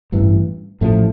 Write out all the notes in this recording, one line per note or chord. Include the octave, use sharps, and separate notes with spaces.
A1 G2 E3
A1 A2 F3 A3